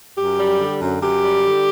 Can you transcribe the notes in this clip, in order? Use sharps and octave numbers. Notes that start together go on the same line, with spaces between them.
F#2 G4
G3
D3
F#2
F#2 G4
G3
D3